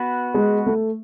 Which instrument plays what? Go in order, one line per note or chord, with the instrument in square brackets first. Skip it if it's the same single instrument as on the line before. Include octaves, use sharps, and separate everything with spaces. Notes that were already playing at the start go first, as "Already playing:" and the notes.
Already playing: [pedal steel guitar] B3 F#4 B4
[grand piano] G#3
A3